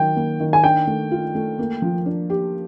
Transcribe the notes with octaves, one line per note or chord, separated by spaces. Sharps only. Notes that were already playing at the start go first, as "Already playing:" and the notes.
Already playing: D#3 F#3 G5
A#3
D#3
G#5
D4 G5
A3
F4
A3
A#3
F3
D4
G4